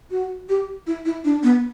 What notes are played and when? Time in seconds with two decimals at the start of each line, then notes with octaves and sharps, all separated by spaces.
0.11 F#4
0.49 G4
0.87 E4
1.05 E4
1.25 D4
1.43 B3